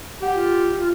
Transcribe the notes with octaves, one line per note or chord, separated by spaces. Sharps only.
G4 F#5
F4
F4